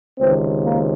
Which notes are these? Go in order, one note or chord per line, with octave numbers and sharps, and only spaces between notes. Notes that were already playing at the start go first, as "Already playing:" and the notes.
C#2 C3 D#3 C4
A#3